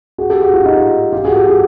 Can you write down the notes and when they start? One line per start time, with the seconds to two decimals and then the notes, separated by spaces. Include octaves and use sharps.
0.18 F#4 G#4
0.30 G4 A4
0.42 F#4 G#4
0.54 F4 G4
0.65 D#4 F4
1.13 F4 G4
1.25 F#4 G#4
1.36 G4 A4
1.47 F#4 G#4